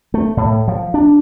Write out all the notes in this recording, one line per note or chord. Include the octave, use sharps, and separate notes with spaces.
A3
A2
F3
D4